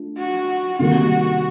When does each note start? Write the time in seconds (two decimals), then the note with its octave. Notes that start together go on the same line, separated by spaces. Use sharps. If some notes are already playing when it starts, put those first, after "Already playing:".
Already playing: A3 D4 F4
0.18 F#4
0.79 C3 D#3 G3 A#3 F#4